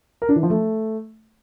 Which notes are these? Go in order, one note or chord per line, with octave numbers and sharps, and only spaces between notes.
A#4
D4
E3
F3
A3